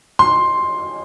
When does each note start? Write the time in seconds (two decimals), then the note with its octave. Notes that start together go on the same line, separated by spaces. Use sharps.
0.19 C6